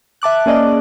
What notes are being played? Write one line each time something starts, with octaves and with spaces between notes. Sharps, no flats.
E5 A5 D6 F#6
A#3 C#4 G#4 D5 D#5